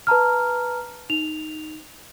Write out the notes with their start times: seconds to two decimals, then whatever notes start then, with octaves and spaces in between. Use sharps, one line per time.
0.07 B4 A5 A#5 F6
1.10 D#4 F7